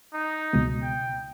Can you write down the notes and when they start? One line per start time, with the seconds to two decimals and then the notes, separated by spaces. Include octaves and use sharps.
0.13 D#4
0.53 C#2 B2
0.82 G5